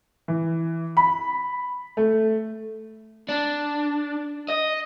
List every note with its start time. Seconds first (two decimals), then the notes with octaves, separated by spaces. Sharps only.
0.28 E3
0.97 B5
1.97 A3
3.29 D4
4.49 D#5